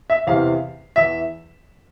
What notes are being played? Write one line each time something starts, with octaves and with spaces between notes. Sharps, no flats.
E5
E2 C3 E3 F5
E2 E3 E5